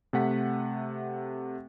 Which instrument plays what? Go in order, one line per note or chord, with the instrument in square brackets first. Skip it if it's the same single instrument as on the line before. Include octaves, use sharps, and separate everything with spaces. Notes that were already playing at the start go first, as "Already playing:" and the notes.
[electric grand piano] C3 A3 F#5 B6